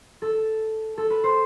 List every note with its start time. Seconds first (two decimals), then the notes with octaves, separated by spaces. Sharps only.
0.22 A4
0.98 A4
1.10 B4
1.24 C5